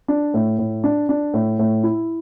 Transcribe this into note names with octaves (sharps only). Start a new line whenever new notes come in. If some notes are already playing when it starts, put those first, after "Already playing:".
D4
A2
A2
D4
D4
A2
A2
E4